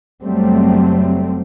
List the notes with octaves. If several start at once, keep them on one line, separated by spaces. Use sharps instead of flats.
F#1 F#3 G3 A3 C4